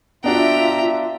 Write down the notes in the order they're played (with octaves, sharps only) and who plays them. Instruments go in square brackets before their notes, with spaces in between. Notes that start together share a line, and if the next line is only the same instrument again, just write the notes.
[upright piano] B3 D4 F#4 [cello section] F4 E5 [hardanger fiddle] G5 A#5